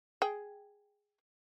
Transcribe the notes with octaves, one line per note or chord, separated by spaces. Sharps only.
G#4 G5